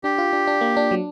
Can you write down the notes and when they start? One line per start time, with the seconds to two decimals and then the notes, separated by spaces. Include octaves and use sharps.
0.04 D4 G4
0.18 F4
0.33 D4
0.47 D4
0.61 A#3
0.77 D4
0.91 F#3